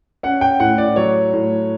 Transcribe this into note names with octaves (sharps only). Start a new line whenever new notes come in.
C#4 F#5
G5
A2 F#5
D5
F#3 C#5
A2